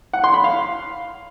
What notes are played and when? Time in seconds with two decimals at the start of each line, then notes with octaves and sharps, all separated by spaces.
0.13 F#5
0.24 C6
0.34 B5
0.44 F5